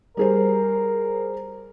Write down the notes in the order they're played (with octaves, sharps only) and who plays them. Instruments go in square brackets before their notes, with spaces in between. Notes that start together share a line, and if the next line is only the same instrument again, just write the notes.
[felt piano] G3 G#4 C5 [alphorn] A#4